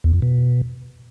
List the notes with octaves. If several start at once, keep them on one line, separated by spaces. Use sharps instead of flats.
E2
F2
B2